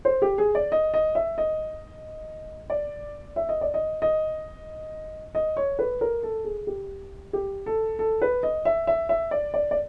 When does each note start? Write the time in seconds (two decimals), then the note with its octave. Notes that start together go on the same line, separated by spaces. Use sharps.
0.05 C5
0.22 G4
0.38 G#4
0.55 D5
0.72 D#5
0.94 D#5
1.15 E5
1.38 D#5
2.70 D5
3.36 E5
3.49 D#5
3.61 D5
3.74 D#5
4.02 D#5
5.35 D#5
5.57 C#5
5.79 B4
6.01 A#4
6.23 A4
6.45 G#4
6.67 G4
7.33 G4
7.66 A4
7.99 A4
8.22 B4
8.43 D#5
8.65 E5
8.87 E5
9.09 E5
9.31 D5
9.54 D5
9.71 D5